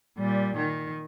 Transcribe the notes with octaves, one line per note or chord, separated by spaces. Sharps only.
A#2 G3
D#3